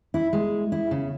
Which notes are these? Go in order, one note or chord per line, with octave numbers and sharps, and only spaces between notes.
E4
G#3
E4
C#3